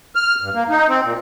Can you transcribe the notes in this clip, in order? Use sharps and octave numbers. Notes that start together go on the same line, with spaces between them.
F6
G2
A#3
D#4
C4
A#2